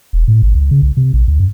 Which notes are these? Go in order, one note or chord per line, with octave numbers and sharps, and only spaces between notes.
E1
A2
G#1
C#2
C#3
C2
C3
A#1
D2
F#2